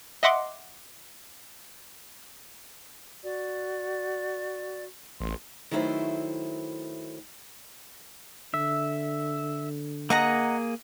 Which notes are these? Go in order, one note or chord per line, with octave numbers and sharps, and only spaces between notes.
D#5 E5 F#5 C6 D6
F#4 D5
A1 C6
D#3 F#3 A3 E4 B4 C5
D3 E5
A#3 G#4 D#5 F#5 A#5